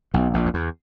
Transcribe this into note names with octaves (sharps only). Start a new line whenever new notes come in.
B1 B2
A#1 A#2
F2
E2